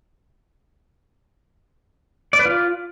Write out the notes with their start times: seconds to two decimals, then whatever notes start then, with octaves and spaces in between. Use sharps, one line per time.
2.33 D5
2.39 B4
2.45 F4